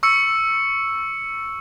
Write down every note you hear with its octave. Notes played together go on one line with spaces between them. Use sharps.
C#6 E6 C#7